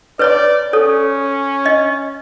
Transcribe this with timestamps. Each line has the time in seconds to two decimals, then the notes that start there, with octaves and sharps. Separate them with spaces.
0.19 B4 C#5 D5 B5
0.73 C#4 A4 C#5
1.66 D#5